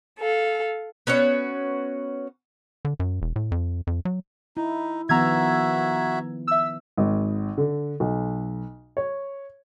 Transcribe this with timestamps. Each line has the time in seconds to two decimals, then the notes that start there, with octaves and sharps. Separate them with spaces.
0.18 A4 F5
1.07 B3 C#4 F#4 C#5
2.85 D3
3.00 F#2
3.22 E1
3.36 A2
3.51 F2
3.87 F2
4.05 F#3
4.57 D#4 E4
5.09 D#3 F3 B3 F#4 E5 A#5 E6 G#6
6.47 E5 E6
6.97 G#1
7.58 D3
8.00 B1
8.97 C#5